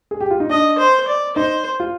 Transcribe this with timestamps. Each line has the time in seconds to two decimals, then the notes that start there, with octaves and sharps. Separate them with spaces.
0.11 G#4
0.21 G4
0.31 F4
0.40 D#4
0.50 D4 D#5
0.78 C5
1.08 D5
1.36 D#4 C5
1.80 F4